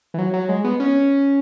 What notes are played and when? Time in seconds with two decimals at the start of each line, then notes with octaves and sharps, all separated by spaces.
0.14 E3
0.19 F#3
0.34 F#3
0.49 G#3
0.64 B3
0.80 C#4